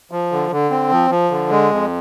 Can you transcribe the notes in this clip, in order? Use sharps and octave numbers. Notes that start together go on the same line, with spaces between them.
F3
D3
D3
C4
F3
F3
D3
G#3
F2